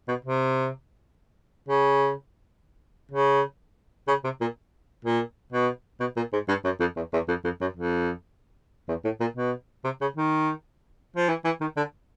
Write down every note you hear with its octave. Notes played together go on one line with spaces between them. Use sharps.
B2
C3
C#3
C#3
C#3
C3
A#2
A#2
B2
B2
A#2
G#2
G2
F#2
F2
E2
E2
F2
F2
F#2
F2
E2
A2
A#2
B2
C3
C#3
D#3
F3
E3
E3
D#3
D3